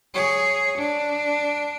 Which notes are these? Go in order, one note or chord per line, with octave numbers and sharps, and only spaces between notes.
G#4 C#5
D4